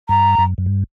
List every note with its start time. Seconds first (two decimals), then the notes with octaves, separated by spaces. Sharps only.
0.08 G2 A#5
0.38 F#2
0.58 F#2
0.66 G2